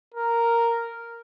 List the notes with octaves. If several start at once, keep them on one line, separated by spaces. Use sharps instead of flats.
A#4